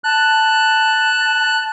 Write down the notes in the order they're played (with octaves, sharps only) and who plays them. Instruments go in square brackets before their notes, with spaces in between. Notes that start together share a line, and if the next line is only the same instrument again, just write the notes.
[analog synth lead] A5 [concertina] F#6